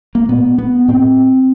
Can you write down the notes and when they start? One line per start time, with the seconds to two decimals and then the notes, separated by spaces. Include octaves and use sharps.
0.15 A#3
0.29 A#2 B3
0.58 B3
0.88 A2 C4